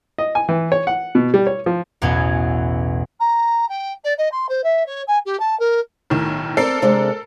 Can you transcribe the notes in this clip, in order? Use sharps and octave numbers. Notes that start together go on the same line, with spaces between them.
D#5
G#5
E3
C#5
F#5
B2
G3
C#5
F3
A1 E2 B2 C#4 F#4 G#6
A#5
G5
D5
D#5
C6
C5
E5
C#5
G#5
G4
A5
A#4
B1 A2 D#3
C4 A4 A#4 D5 C7
C3 G#3 D4